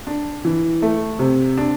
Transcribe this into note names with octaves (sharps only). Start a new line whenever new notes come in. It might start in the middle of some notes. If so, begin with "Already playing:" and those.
D4
E3
A3
C3
D4